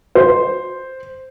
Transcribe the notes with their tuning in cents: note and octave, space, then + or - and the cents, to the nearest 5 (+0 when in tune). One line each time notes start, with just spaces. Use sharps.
C5 +0